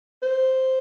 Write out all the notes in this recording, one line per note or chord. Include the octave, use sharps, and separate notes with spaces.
C5